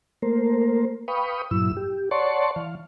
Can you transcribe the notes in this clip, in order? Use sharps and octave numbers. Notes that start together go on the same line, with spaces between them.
A3 A#3 A#4 C5
B4 F5 G5 B5 C#6 D#6
G2 A#2 F#3 E4 E6
G4
C#5 D5 F#5 A5 C6 C#6
E3 F5